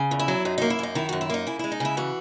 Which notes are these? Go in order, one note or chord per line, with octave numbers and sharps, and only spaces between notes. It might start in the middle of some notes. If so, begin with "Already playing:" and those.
Already playing: C#3
E2
E4
F#3
F#2 D#4
A#3 D#4
E4
F#2 D#4
D#3 E4
F#2 F#4
E4
A#3 D#4
C#3 E4
G#3 E4
D#4
C#3 E4
E3 F#4